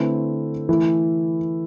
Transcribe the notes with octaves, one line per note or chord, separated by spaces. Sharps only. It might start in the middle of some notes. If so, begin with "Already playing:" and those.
Already playing: D3 A3 C4 E4 B4
E3 A3 E4